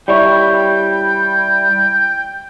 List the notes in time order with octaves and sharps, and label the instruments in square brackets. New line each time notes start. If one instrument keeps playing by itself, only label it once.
[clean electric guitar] G3 E4 C#5 [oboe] G5